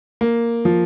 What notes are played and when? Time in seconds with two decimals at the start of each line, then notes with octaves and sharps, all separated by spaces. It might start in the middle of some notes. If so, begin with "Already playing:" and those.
0.21 A#3
0.65 F3